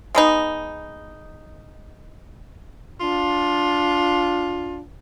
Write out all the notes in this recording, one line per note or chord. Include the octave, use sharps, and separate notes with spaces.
G#3 B3 D#4
D4 F4